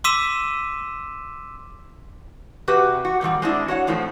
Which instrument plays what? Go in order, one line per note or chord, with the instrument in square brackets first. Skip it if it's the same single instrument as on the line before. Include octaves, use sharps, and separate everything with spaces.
[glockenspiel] C6 D6 E6 B6 D#7 E7
[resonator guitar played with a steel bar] C3 F#4 G4 B4 F#5
F#4
A#2 D#3 F3 G3
G#3 C4 D4 E4
F#4 C#5 F#5
F2 A2 F3 A3 C4